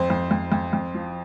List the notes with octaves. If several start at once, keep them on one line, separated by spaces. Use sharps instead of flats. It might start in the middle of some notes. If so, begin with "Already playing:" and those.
Already playing: F2 C5
F2
F2
F2
F2
F3